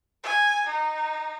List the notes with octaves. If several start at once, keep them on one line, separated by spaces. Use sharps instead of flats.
G#5
D#4